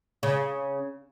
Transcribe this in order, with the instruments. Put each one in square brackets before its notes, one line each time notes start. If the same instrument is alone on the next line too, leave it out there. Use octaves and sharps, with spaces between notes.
[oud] C#3